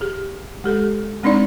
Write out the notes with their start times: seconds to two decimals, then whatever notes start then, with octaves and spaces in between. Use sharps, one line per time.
0.01 G4 G#4
0.64 G#3 G4 A4
1.23 G#3 C4 D4 D#4 D5